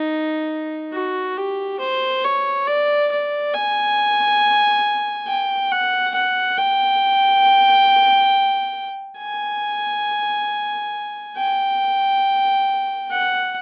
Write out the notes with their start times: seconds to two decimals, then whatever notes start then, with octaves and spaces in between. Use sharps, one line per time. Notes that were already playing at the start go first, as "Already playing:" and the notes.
Already playing: D#4
0.93 F#4
1.37 G4
1.80 C5
2.24 C#5
2.67 D5
3.11 D5
3.54 G#5
5.28 G5
5.72 F#5
6.15 F#5
6.58 G5
9.19 G#5
11.36 G5
13.11 F#5